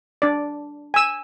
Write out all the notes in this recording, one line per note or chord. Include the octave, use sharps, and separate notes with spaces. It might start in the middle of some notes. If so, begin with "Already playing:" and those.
D4 D5
G#5 E6